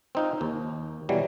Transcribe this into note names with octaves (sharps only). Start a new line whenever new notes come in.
C4 D#4 F4
D#2
B2 E3 F#3 G3